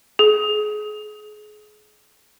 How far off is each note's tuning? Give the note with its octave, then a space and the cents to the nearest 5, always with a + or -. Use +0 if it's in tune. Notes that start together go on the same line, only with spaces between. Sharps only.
G#4 +30